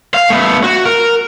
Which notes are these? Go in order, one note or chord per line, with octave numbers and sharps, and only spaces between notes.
F5
A3 B3
F#4
A#4